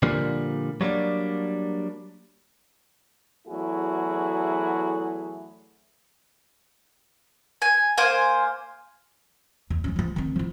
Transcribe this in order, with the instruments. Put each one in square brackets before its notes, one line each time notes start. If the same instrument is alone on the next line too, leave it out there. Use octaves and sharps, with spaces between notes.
[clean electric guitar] A#2 D3 F3 G3 A#3
F#3 G3 A#3 D4
[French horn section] E2 F#3 A3 E4 F#4 G#4
[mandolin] G#5
A#3 C5 G#5
[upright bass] E2
F3 C#4
E3 F3
D#3 C4
F3 E4